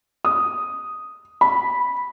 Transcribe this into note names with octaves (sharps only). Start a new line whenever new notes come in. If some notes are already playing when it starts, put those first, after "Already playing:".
D#6
B5